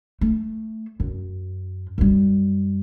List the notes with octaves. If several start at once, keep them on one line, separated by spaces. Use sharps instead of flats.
A3
F#2
F#2 G3